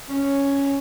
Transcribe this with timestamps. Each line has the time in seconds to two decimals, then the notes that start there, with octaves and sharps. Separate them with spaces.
0.10 C#4